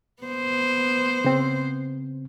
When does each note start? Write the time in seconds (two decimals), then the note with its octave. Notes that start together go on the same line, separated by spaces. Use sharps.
0.23 B3 C5
1.24 C#3 C4